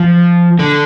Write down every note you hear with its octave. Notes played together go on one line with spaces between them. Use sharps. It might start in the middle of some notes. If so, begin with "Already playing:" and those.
Already playing: F3
D3